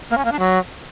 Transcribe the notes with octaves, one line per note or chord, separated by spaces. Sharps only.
A#3
C#4
A#3
D4
F#3